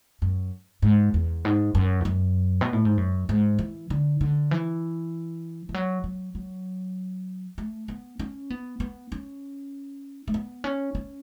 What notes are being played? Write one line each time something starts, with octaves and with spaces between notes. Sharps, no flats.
F#2
G#2
E2
G#2
F#2
E2
F#2
B2
A2
G#2
F#2
G#2
E3
D3
D3
E3
E3
F#3
F#3
F#3
A3
B3
C#4
B3
B3
C#4
A3
B3
C#4
C#4